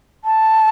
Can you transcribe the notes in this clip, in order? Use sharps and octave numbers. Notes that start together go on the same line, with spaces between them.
A5